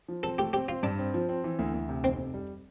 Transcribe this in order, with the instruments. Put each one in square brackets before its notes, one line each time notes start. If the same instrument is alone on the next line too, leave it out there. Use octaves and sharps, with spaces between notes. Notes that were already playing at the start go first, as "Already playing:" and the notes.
[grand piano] F3
[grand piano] C4 [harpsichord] A4
[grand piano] A3 [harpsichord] G4
[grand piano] C4 [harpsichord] G4
[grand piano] C4 [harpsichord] F4
[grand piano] G2 [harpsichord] D4
[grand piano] C4
F3
C4
E3
D2
D2
C3
[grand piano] F1 [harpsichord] C4
[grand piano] F1
G3